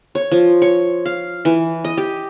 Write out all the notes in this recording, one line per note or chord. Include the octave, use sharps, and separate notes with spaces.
C#5
F3
C#5
F5
E3
D#5
G4